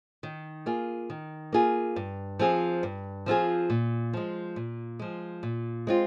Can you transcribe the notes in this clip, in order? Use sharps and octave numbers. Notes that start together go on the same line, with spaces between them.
D#3
A#3 F4 G#4
D#3
A#3 F4 G#4
G2
F3 C4 F4 G#4
G2
F3 C4 F4 G#4
A#2
F3 G#3
A#2
F3 G#3
A#2
G#3 C4 F4